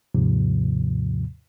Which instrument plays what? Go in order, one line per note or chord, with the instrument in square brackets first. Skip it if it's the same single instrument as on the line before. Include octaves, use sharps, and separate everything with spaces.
[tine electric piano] D#2 G#2 C3 F3